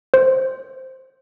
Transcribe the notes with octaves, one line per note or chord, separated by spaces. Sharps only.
C5